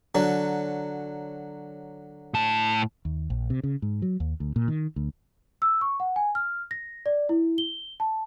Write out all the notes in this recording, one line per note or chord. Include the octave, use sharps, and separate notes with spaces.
D3 F#3
A2 A5
D#2
A#1
C3
C#3
G#2
F#3
D#2
D2
A#2
D#3
D2
E6
C#6
F#5
G#5
F6
A#6
D5
E4
G7
A5